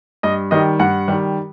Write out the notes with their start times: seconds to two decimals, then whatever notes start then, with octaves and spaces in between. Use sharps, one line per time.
0.23 G2 D#5
0.51 D#3 G3 D#5
0.80 G2 F#5
1.08 D#3 G3